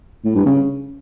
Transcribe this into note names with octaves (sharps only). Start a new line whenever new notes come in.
A2
G2
C#3